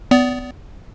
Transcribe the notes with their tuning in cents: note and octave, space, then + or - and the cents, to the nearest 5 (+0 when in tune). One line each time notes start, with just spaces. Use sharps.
B3 +25 D5 -25